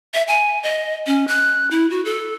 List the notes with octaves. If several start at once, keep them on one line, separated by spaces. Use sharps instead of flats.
E5
G#5
D#5
C#4
F#6
E4
F#4
A4